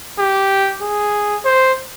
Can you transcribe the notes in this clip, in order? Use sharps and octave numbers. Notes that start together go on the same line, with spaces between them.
G4
G#4
C5